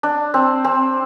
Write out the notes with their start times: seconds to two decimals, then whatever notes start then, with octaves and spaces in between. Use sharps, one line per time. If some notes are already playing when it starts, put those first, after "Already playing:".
0.03 D4
0.34 C4
0.64 C4